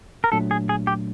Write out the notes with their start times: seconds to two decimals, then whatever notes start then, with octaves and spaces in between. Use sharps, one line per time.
0.24 A#4
0.32 A#2 F#3 A3 D4 A4
0.51 G#4
0.69 G#4
0.87 G4